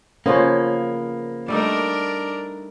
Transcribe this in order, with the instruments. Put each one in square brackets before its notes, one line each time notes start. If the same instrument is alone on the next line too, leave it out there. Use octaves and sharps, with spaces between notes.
[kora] C#3 F3 B3 [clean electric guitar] A#3 [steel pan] C#4 C5 C#5
[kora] G3 A3 D#4 [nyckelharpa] D4 A#4